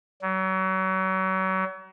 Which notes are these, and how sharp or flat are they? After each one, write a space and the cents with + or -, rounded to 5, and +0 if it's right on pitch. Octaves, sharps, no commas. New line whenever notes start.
F#3 +35